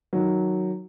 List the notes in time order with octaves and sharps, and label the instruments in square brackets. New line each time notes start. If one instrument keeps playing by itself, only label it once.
[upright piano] D#3 F#3